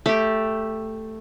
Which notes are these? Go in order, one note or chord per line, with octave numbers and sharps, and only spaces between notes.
A3 G4